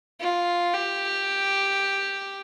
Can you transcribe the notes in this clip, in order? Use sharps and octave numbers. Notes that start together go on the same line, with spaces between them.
F4
G4